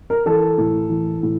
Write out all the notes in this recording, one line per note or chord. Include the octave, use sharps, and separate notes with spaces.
A#4
E3 A4
A2
E3
A2